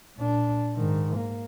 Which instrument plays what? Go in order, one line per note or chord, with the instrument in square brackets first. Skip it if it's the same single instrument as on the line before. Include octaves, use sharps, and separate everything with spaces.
[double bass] A#2 D4
G#2 D#3
A#3